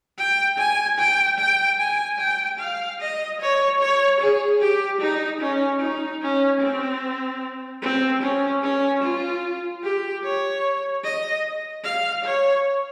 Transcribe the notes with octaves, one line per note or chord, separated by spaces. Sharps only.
G5
G#5
G5
G5
G#5
G5
F5
D#5
C#5
C#5
G#4
G4
D#4
C#4
D#4
C#4
C4
C4
C#4
C#4
F4
G4
C#5
D#5
F5
C#5